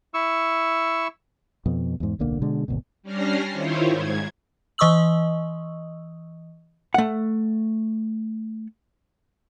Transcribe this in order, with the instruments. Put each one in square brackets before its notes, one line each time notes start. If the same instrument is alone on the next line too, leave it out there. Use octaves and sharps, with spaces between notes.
[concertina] E4 C#6 E6
[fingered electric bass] F2 B2
E2 G#2
D1 B1 D3 A#3
B2 D3 G#3
G#1 D2 B2
[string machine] G3 C#4 D4 F6 A#6 C7
D#3 E4 F4 C5 C#5
G#2 G#6
[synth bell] E3 D#5 C#6 D#6 E6 F#7
[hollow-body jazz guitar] A3 F#5